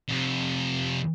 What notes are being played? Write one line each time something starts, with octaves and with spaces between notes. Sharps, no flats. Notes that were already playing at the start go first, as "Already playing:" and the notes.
F2 C3